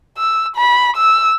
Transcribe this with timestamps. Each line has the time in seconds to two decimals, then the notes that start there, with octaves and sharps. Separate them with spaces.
0.18 E6
0.56 B5
0.97 E6